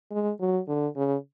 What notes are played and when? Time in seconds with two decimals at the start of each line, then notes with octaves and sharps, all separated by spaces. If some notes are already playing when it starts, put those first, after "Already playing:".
0.11 G#3
0.40 F#3
0.68 D3
0.96 C#3